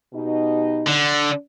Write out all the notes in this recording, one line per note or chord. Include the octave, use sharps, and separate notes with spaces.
B2 D#4 G4
D3